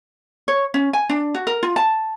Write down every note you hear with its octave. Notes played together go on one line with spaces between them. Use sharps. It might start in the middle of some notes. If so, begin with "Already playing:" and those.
C#5
C#4
G#5
D4
F#4
A#4
F4
A5